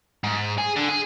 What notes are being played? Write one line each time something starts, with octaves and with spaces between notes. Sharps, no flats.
G#2
G#4
D3
G#4